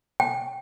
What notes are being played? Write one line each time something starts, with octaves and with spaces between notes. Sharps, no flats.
G5